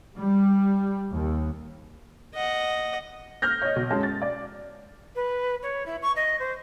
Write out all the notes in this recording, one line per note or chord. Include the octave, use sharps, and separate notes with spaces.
G3
D#2
D#5 F#5
F6 G6 A#6
C#5 D#5
B1
F#2 G#3 C#4 A5
A6
D5
B4
C#5
E4
C#6
D#5
C5